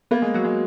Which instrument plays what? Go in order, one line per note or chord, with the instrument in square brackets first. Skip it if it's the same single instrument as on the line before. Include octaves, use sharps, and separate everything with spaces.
[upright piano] A#3 [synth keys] B3
[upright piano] G#3
[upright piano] F#3 [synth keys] F#4
[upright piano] G#3